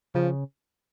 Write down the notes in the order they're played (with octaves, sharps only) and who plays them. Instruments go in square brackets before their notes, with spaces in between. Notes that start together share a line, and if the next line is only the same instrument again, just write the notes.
[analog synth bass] C#3 [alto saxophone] F3